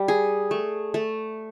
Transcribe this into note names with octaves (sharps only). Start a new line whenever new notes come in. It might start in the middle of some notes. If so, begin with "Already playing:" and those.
Already playing: G3
G#4
A3
A3